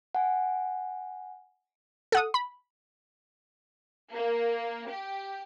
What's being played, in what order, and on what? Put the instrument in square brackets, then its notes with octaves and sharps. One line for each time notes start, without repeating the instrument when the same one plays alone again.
[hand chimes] F#5 G#5
[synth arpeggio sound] A4 F#5 D#6
B5
[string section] A#3
G4